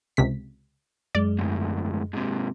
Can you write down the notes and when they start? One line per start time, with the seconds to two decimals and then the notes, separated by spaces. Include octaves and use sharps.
0.17 C#2 C3 B6
1.15 F#2 G#3 D5
1.39 D2 G#2
2.13 G#2 C3